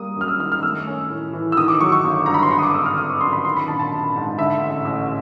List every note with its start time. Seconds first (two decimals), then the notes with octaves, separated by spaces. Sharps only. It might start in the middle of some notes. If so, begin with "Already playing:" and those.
Already playing: G3 A#3 D#6
0.16 F#2 F6
0.28 E6
0.40 D#3 F6
0.52 F6
0.63 A3 E6
0.87 C#4
1.10 A2
1.33 E3
1.52 E6
1.57 D#3 D#6
1.68 D6
1.81 F#3 C#6
1.92 C#6
2.05 G1
2.26 G2 A#5
2.34 B5
2.43 C6
2.51 D3 C#6
2.58 D#6
2.63 D6
2.74 G#1 E6
2.86 F6
2.98 G#1 D#6
3.10 C#6
3.21 F#2 C6
3.33 B5
3.45 D#3 C6
3.56 B5
3.68 A#1 A5
3.79 A5
3.91 A#1
4.16 G#2
4.38 D3 E5
4.61 A1
4.85 A1